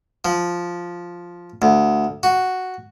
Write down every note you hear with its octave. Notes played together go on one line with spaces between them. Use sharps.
F3
D2
F#4